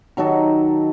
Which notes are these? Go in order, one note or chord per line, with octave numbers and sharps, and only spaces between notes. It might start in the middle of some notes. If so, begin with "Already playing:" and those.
D#3 F#3 D#4 A4